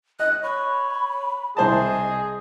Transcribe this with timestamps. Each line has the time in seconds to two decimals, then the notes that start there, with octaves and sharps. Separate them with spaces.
0.20 D#5 F#6
0.43 C#5 B5
1.57 C2 G#4 C5 D#5 A5